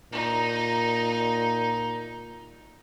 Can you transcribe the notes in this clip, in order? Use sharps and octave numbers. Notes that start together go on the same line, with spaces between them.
A#2 D#4